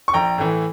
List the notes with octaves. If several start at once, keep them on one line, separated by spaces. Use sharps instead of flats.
C#6
A#1 G5 A#5
A2 E3